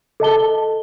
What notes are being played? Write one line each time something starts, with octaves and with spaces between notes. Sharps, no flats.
A4 D#5 A5 G7